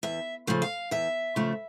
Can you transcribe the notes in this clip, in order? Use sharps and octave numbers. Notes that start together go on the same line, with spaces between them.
E2 E5
C#3 F3 A3
F5
E2 E5
C#3 F3 A3